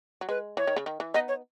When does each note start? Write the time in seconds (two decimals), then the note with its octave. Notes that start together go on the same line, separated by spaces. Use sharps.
0.21 F#3
0.29 G#3 B4
0.57 E3 C#5
0.67 D#3
0.76 C#3
0.86 D#3
1.00 E3
1.14 B3 D#4 D#5
1.29 C#5